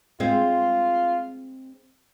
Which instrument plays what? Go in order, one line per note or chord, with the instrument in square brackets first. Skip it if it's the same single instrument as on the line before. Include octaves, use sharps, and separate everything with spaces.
[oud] G#3 C4 [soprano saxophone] F4